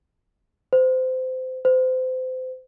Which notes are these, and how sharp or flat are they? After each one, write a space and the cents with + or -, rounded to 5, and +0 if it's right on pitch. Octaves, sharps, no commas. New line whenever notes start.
C5 -25
C5 -30